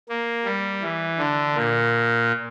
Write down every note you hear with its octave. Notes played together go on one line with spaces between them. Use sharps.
A#3
G3
E3
D3
A#2